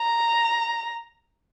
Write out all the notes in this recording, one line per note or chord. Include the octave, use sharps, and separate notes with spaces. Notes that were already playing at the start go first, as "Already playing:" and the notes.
Already playing: A#5